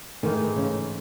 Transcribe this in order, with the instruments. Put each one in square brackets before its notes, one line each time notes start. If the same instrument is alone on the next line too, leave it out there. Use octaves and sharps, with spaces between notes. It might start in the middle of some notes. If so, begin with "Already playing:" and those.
[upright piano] G#2 E3 A3 [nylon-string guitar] D#3
[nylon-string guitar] C#3